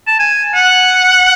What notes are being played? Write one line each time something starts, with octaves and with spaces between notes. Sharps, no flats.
A5
G#5
F#5